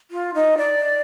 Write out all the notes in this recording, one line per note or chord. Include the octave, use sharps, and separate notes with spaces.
F4
D#4
D5